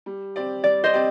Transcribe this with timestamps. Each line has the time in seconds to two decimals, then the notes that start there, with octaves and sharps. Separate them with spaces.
0.06 G3
0.36 C4 G4 D5
0.64 G3 D5
0.84 C5 D#5
0.94 C4 G4 D5